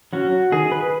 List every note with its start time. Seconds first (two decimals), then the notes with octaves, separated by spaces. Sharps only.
0.13 F#3 C#4 F#4
0.52 D#3 G#4
0.72 B4